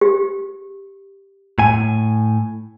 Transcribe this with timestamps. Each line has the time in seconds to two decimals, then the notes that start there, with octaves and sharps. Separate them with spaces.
0.01 G4
1.58 A2 G#5